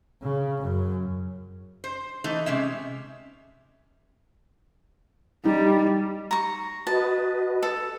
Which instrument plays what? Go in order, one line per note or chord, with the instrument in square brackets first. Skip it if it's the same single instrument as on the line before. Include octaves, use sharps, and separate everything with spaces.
[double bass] C#3
F#2
[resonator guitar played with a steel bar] C5
E3 A3 D#4
C3 G#3 C#4 E5
[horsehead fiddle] G3 [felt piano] D#4
[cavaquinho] A#5 C#6
[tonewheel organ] F#4 B4 D#5 [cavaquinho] A5
[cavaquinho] A4